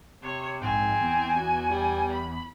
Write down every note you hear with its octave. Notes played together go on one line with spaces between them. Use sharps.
C3 C#5
A#1 G#2 C4 G#5
E2
F#4
G3
B5